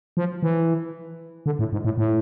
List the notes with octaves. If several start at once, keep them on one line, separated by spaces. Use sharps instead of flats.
F3
E3
D3
A2
G#2
A2
A2